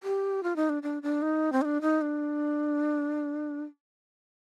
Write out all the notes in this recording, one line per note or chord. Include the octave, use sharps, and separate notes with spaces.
G4
F4
D#4
D4
D4
D4
D#4
C4
D#4
D4
D#4
D4